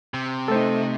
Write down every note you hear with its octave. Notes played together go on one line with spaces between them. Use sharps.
C3
A3 D#4 A4 C5